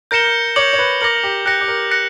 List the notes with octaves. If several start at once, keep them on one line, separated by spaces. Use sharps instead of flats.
A#4 G6 A#6 C#7 E7 G7
C#5 D6 G6 C#7 F#7
C#5
B4
A#4 D6 A#6 C#7 F#7
G4
G4 F#6 A#6 C#7
G4
A#4
F#6 A#6 C#7